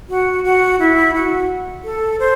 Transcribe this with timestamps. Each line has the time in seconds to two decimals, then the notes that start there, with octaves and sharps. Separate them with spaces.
0.09 F#4
0.44 F#4
0.79 E4
1.14 F#4
1.84 A4
2.19 C5